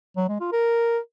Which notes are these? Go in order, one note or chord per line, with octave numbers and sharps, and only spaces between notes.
F#3
G#3
F4
A#4